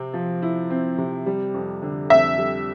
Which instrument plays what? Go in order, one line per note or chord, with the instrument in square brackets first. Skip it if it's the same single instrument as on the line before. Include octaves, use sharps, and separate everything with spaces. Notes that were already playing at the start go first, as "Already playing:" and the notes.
Already playing: [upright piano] C3 C4
F3
E4
C4
C3
G3
F2
D3
[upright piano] F2 [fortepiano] E5
[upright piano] G3